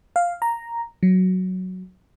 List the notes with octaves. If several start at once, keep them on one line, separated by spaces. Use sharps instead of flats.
F5
A#5
F#3